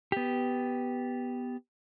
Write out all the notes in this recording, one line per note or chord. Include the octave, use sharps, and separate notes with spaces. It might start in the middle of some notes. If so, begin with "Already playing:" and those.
B3 G4